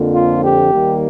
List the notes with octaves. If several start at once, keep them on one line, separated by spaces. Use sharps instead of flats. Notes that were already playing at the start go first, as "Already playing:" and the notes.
Already playing: F2 D3 F3 A#3
F4
G4
D#2 D#3 G3 A#3